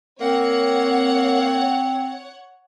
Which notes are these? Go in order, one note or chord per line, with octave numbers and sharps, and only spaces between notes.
A#3 C4 C#5 F#5